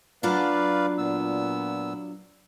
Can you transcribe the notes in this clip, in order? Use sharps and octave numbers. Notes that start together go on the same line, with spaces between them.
F#3 D4 F4 B4 D5 F5
A#2 B3 E6